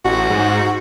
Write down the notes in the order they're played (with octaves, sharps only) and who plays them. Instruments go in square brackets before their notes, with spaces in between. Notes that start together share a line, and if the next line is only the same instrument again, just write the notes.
[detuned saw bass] A1 [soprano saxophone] F#4
[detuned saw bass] G#2